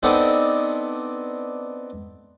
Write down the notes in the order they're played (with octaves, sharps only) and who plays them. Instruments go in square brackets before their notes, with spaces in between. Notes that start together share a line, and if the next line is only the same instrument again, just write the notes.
[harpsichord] B3 C4 D4 D#4 A4